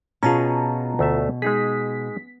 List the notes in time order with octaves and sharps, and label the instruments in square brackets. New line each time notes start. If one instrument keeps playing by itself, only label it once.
[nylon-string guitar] B2 [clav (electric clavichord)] C#4 G#4 [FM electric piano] F4 A5 A#5
[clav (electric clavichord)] D2 A3 E5
[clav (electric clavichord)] G#3 D#4 G#4 [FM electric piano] B6